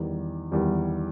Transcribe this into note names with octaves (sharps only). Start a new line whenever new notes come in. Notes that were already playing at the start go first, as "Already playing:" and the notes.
Already playing: E2 D#3 G3
E2 D#3 G3